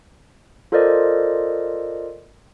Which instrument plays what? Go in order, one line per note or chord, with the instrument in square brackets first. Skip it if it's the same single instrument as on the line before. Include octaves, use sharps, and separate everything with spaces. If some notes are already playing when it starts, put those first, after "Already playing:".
[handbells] F4 A4 A#4 C5 D5 D#5